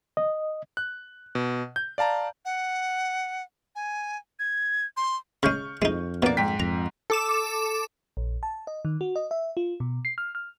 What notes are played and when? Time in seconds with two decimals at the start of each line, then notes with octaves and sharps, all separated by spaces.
0.17 D#5
0.77 F#6
1.35 B2
1.76 G6
1.98 D5 F5 A5 A#5
2.45 F#5
3.76 G#5
4.39 G#6
4.97 C6
5.43 C#3 G#3 C#6 F6 G6
5.82 F2 G#3 D#4
6.23 B2 A#3 D4 D5
6.37 G#2 G5 B6
6.60 F2 A#5
7.10 A4 D6 E7
8.17 A#1
8.43 A5
8.67 D#5
8.85 D#3
9.01 F#4
9.16 D#5
9.31 E5
9.57 F4
9.80 B2
10.05 C7
10.18 F6
10.35 F6